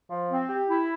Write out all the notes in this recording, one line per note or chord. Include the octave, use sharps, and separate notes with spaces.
F3
C4
G4
E4